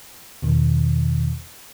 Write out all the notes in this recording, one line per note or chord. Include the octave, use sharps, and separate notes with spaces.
E2 B2 D#3